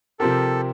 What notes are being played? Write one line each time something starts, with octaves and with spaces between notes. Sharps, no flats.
C3 F3 C4 G4 A4 A#4